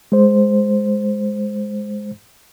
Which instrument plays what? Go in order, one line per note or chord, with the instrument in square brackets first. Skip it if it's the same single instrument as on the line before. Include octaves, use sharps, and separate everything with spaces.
[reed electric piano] G#3 C5